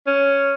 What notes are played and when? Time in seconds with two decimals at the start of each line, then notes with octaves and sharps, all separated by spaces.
0.07 C#4